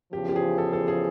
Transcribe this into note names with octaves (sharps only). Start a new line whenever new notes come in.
E2 C#3 F3 G4
G4
G#4
A4
A4
G#4